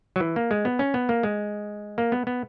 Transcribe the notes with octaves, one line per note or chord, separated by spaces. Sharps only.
F#3
E3
A#3
G#3
B3
C#4
B3
A#3
G#3
A#3
B3
B3